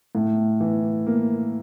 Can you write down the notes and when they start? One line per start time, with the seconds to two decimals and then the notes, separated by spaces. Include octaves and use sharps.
0.15 A2
0.60 E3
1.07 A#3